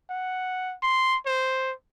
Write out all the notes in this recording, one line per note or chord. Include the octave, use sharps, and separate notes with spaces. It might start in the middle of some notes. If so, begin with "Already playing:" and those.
F#5
C6
C5